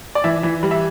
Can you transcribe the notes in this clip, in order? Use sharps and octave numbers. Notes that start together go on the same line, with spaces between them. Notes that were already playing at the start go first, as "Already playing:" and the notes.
D5
E3 E5
E3
G3
E5